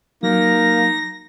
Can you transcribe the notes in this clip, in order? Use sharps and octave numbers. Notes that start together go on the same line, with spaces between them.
F#3 A#3 D#4 A#6